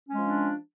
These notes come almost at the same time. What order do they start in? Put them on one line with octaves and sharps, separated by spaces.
C#4 G#3 F3 D4